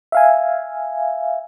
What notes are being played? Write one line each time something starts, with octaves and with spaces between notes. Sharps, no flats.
E5 F5 G#5